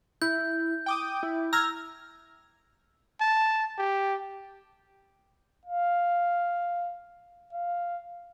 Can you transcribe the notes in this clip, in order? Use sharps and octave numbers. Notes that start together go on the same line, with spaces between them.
E4 G6
G5 D6 D#6
E4
A#5 E6 F6 G#6
A5
G4
F5
F5